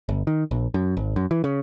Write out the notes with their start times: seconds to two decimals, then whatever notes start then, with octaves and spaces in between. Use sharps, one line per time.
0.09 G1
0.27 D#3
0.51 A#1
0.74 F#2
0.97 G#1
1.16 F#2
1.31 E3
1.44 C#3